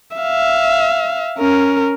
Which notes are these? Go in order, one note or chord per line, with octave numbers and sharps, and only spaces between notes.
E5 F5
C#4 A#4